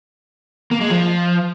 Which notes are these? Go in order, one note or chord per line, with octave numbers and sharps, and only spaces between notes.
A#3
G#3
F3